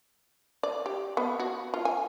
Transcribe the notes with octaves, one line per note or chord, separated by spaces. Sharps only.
D5
G4
B3
F#4
F4
G#5